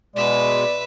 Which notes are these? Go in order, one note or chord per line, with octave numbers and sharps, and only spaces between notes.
B2 G#3 B4 D5 E5